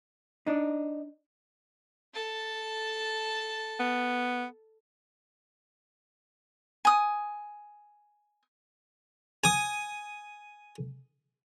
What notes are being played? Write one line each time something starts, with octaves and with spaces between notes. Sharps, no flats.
D4 D#4
A4 A5
B3
G#5 D#6
G#5 D#6